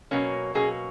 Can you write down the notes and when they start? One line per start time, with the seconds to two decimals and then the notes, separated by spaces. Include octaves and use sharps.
0.11 B2 F#3 A#3 C#4
0.55 B2 F#3 A#3 C#4 G#4